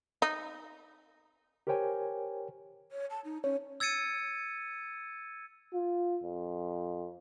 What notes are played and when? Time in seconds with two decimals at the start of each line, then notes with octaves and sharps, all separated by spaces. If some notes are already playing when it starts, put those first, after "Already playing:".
0.22 D#4
1.67 G4 A#4 C5 C#5 G5 G#5
2.91 C#5
3.10 A5
3.25 D#4
3.44 C#4 C#5
3.80 E6 G#6 A6 C#7 D#7
5.74 F4
6.23 F2